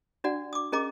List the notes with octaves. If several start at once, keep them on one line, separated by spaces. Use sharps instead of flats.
D4 F#4 D5 F#5
D6 D#6
C#4 G#4 A#4 D#5 A#5 D6